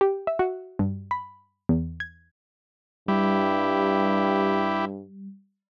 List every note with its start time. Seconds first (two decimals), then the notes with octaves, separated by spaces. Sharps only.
0.01 G4
0.27 E5
0.39 F#4
0.79 G2
1.11 B5
1.69 E2
2.00 G#6
3.08 G2 G3 E4 G4